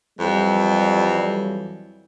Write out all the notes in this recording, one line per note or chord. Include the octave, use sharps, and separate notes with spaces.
F2 E3 F#3 G3